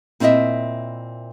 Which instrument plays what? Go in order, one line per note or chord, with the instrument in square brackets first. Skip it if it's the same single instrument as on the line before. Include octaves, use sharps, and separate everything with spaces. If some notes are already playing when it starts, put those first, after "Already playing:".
[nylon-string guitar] A#2 C4 E4 G4 D#5 E5